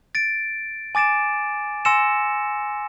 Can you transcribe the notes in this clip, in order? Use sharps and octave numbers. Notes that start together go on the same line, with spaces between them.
A6 D7
G#5 D6 A6 D7 E7
G#5 C6 E6 A#6 C#7 E7